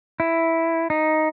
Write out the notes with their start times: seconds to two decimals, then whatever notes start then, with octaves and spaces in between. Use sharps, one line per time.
0.20 E4
0.90 D#4